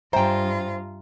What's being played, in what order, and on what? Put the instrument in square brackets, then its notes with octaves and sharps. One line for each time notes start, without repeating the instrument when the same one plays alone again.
[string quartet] G2 F4 [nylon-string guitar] C5 G5 [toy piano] E5 G#5 A#5